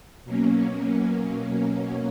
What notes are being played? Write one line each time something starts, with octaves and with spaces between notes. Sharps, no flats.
B2 F#3 A#3 C#4